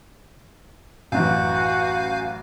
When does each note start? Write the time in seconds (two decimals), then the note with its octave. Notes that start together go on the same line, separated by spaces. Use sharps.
1.12 A1 F#2 E3 F#4 F5 G#5 G6